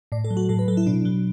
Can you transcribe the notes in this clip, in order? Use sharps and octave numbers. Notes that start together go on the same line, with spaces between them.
A2 D5
A4
F#3
F#4
A2 A4
B4
F#3 A4
E4
B2 D4
F#3